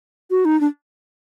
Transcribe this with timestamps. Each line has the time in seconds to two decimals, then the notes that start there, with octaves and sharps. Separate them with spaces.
0.31 F#4
0.45 D#4
0.61 D4